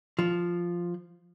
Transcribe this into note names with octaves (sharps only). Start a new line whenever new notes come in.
F3